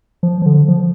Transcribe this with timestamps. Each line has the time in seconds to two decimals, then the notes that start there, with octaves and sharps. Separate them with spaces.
0.23 F3
0.42 F3
0.46 D3
0.68 F3